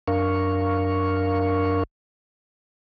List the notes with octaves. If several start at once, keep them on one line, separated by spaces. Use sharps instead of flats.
F#2 D4 A#4 F5 C#6